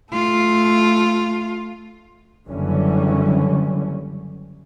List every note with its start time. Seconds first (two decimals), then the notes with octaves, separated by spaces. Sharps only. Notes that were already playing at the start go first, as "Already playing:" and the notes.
0.12 A3 F4
2.47 F#1 D3 E3 F#3 G3 C#4